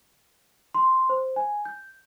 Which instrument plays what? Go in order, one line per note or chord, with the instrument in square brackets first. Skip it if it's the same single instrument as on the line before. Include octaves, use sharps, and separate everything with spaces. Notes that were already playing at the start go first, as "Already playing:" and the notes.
[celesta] C6
C5
G#5
G6